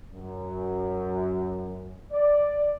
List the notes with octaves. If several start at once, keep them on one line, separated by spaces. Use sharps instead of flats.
F#2
D5